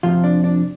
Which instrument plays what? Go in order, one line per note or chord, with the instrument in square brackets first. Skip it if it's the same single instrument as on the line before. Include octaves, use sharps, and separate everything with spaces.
[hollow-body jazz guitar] F2 C3 F3 F4
D4
D4